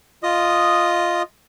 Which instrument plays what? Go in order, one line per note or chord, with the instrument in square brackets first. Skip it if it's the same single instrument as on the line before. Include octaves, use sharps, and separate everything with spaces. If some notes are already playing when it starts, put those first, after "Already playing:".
[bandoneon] F4 D#5 D#6